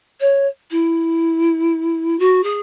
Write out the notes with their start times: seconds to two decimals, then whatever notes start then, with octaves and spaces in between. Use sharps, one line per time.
0.20 C#5
0.71 E4
2.19 F#4
2.43 G#4